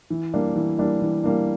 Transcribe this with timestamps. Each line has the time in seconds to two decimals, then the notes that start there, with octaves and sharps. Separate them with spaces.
0.10 E3
0.34 G3 A#3 D4
0.55 E3
0.78 G3 A#3 D4
1.02 E3
1.24 G3 A#3 D4